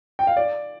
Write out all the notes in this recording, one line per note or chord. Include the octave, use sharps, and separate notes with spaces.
G5
F5
D5